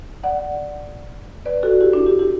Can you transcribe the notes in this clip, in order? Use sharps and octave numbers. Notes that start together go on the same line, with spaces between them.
D5 F#5
B4 D5
F#4 A4
E4 G4
D4 F#4
E4 G4
E4 G4